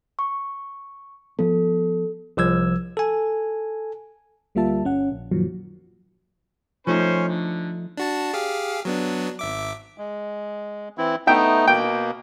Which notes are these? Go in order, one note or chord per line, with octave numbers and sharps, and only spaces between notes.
C#6
F3 B3 A4
C2 F3 E6 G#6
A4 G#5
D2 G3 A#3 F4 E5 A5
G1 C#4 F#5
A#1
F#2 A#2 D#3 F3 F#3
F3 A3 C#4 D#4 C5
D3
D4 F#4 A5
G4 G#4 F5
F#3 B3 D4
G#1 E5 D6
G#3
E3 C4 E4
A3 B3 D#4 E5 G5
B2 A#3 G5